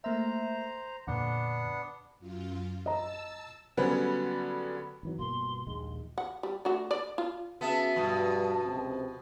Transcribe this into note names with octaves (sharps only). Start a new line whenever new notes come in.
A3 A#3 C5 E5 A#5
F2 A#2 D3 B3 D4 F#5
F#2 F4
D#5 A5 A#5 E6
D3 F#3 G3 B3 C#4
G#1 E3 F#3
G1 B2 A#3 C6
A#1 D#2 G#3
F#5
G3
D3 A3 F#4
D5
F4
C#3 B3 F#4 E5 A5
G2 B2 F3
C#2 C3 C4